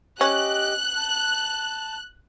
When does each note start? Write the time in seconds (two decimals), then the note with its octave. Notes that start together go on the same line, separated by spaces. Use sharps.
0.21 C#4 G4 D#5 F#6
0.97 A5